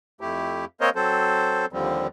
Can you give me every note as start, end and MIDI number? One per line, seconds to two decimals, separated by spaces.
0.21 0.65 41
0.21 0.65 57
0.21 0.65 64
0.21 0.65 67
0.81 0.90 58
0.81 0.90 60
0.81 0.90 70
0.81 0.90 72
0.81 0.90 73
0.81 0.90 75
0.95 1.66 54
0.95 1.66 60
0.95 1.66 69
0.95 1.66 72
1.73 2.07 39
1.73 2.07 50
1.73 2.07 53
1.73 2.07 55
1.73 2.07 60